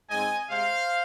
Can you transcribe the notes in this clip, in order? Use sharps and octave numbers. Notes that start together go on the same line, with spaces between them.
G#2 G#3 C4 D#5 G#5
C3 G#3 C4 C5 F5